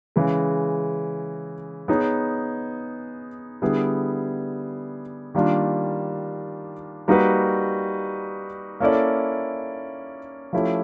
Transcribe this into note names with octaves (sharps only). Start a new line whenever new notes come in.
C#3 E3 G#3
B3 D#4 G#4 C#5
D3 G3 B3 E4 G#4
D#3 G3 A#3 D4 F4
G3 A#3 D#4 F#4 B4
A#3 C#4 E4 A4 D5
F3 A3 C#4 E4 G4